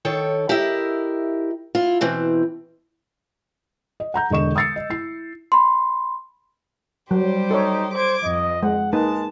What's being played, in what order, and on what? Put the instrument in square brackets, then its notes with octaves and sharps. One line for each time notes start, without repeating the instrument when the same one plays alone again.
[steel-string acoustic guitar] D#3 A4 C#5 G5
E4 G4 A#4 D#5 E5
E4 F4
B2 E3 C4
[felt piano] D#5
F#5 A#5 G6
E1 D3 D#5 C#6 E7
D#6 E6 A6 C7 C#7
D#5
E4 C7
[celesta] B5 C6
[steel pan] F#3 [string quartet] G3 G4 C5
[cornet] D#4 [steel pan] A4 C#5
[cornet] C5 [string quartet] D6 G#6
[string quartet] F2 [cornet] D#5
[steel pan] G#3 [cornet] F#5
[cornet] G#3 [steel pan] A#3 D#4 B4 [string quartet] A5